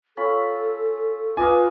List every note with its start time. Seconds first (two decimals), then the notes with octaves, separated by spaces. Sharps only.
0.17 C#4 F4 A4 B5
1.37 F4 B4 D5 D#5 F5 G#5